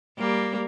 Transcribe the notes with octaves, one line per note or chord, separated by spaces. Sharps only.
G3 A#3